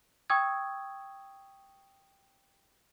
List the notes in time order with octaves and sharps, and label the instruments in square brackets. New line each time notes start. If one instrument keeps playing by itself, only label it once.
[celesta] G5 C#6 D#6 E6 G#6